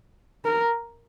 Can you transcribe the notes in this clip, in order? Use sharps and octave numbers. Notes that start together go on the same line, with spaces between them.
A#4